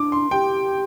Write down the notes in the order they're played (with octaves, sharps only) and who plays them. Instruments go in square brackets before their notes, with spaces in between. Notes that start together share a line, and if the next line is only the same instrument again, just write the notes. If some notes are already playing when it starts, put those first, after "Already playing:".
Already playing: [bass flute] D4 [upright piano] D6
[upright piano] C6
[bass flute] G4 [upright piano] G5